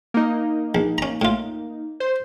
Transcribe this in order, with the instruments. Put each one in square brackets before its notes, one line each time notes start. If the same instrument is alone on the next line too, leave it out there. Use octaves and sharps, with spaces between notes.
[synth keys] A#3 D#4
[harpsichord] A#1
C#4 A#5
A2 F4
[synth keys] C5